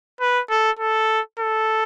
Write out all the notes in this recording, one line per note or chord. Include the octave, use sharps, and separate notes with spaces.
B4
A4
A4
A4